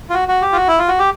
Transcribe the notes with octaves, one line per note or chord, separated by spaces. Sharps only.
F4
F#4
F#4
G4
F4
F#4
E4
F4
F#4
G4